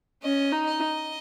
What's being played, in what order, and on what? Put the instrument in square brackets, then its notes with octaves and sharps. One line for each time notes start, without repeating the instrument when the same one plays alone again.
[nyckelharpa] C#4 [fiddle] D#5
[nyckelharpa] D#4
[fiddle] D#5